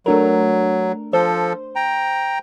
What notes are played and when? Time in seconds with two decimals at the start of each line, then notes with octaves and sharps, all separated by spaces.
0.06 F#3 A3 D4 A#4
1.13 F3 A4 C5
1.75 G5 A#5